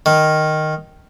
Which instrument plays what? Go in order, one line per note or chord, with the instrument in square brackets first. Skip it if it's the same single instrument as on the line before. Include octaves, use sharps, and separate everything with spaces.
[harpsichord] D#3